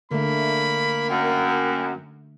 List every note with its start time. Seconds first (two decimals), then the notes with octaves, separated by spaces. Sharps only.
0.11 D3 A3 A#3 B5
1.10 F#2 G5